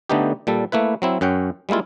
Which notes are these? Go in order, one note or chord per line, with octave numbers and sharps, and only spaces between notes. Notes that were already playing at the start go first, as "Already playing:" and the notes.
D3 A3 B3 D#4 G4
A#2 G3 A4
A3 A#3 E4 B4
F#3 C4 E4
F#2 C#4 F#5 G5
G3 G#3 A#3 E4 F4